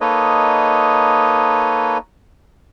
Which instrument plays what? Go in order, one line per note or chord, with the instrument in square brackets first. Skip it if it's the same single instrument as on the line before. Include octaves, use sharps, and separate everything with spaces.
[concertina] A#3 D#4 A4 B4 C#5 D#5